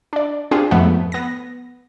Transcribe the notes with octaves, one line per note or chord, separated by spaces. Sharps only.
D4 D5
C4 D4 F4 G4 G#4
F2 G#2 F3 A3 B3
B3 A#6